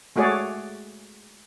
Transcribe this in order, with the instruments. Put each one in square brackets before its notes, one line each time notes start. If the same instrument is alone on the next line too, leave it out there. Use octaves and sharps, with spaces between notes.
[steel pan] G#3 A3 F#4 G#4 C#5 D5